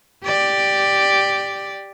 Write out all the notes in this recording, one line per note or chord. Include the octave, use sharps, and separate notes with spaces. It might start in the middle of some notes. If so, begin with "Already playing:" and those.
G4 D5